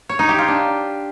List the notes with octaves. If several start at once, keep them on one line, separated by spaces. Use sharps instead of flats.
C#5
D#4
G4
F4
D4